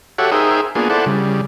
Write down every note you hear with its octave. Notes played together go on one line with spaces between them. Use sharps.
F#4 G4 A4 C#5 E5 F#5
D#4 G#4 A#4 C5 E5 G5
A#3 B3 D4 F4 G#4
E4 A4 C5 D5 F#5
C#3 G3